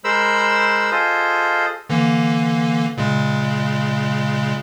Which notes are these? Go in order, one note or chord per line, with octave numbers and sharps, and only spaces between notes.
G#3 A#4 C5 B5 E6
F4 G#4 A4 C5 D#5
D3 E3 A#3
A#2 C#3 G#3